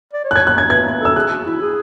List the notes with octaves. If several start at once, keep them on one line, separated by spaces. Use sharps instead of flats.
D5
C#5
F#6
G#6
F#6
G#6
B4 G#6
A4 E6
G#4 F#6
F#4
E4
G#4